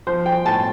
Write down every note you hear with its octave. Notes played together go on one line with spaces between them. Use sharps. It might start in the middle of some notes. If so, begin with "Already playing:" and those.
F3 C5
G5
A2 A5